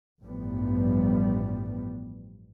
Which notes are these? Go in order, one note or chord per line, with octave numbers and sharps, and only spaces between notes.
A1 G2 F3 G3 B3